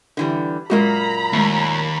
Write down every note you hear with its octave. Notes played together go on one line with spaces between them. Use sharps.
D3 E3 G3
F#2 A#2 G#3 A#3 F#4 A#5 B5
D#2 G#3 A3